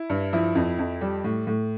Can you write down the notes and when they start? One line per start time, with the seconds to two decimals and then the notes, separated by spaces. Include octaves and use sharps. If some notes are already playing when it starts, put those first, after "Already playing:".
Already playing: E4
0.10 G2
0.33 F3 E4
0.55 F2
0.79 F2
1.01 G3
1.24 A2
1.47 A2